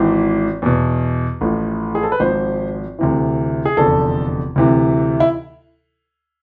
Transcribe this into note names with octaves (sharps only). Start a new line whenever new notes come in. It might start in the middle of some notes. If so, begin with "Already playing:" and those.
Already playing: G#1 G#2 E3
E2 B2
A1 A2 F3
G#4
A4
B4
G#1 G#2 F3 C5
D2 C3 E3
G#4
F1 E2 D3 F3 A4
D2 C3 E3
E4